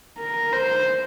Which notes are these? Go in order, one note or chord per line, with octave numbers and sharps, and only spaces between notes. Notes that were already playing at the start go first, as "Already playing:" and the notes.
A#4
C5